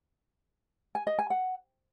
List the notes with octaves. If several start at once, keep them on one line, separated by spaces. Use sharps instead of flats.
G#5
D#5
G#5
F#5